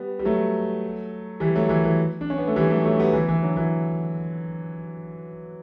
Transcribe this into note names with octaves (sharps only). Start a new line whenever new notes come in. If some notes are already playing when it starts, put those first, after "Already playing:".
Already playing: G3 B3
G3
F#3 A3
E3 G3
F#3 A3
E3
E3
D4
C#4
B3
A3
E3 G3
F#3 A3
F#3 A3
G3 B3
E3
E3
D3 F#3
E3